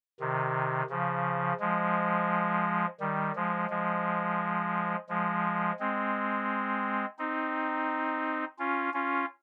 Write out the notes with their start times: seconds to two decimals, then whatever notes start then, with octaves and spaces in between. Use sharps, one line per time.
0.20 C3 D#3
0.90 C#3 F3
1.60 F3 G#3
3.00 D#3 G3
3.35 F3 G#3
3.70 F3 G#3
5.09 F3 G#3
5.79 G#3 C4
7.18 C4 D#4
8.59 C#4 F4
8.93 C#4 F4